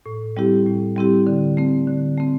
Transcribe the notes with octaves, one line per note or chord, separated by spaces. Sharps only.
A2
G3 C4 E4 G4
A2
G3 C4 E4 G4
D3
A3 C4
D3
A3 C4